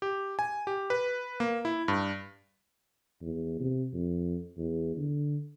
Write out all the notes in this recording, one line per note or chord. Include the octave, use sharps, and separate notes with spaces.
G4
G#5
G4
B4
A#3
E4
G2
E2
C3
F2
E2
D3